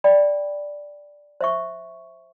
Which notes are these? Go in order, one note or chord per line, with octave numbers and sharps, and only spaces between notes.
D5 G5 B5
C5 E5 C#6